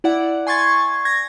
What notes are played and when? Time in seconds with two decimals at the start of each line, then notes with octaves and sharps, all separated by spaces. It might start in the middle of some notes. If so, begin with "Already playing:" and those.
0.04 E4 D5 F#5
0.47 G#5 C6 C#6 G#6 A6
1.05 G#6 A#6